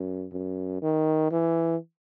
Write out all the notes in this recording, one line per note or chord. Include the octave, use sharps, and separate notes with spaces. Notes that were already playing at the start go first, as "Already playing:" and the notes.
Already playing: F#2
F#2
D#3
E3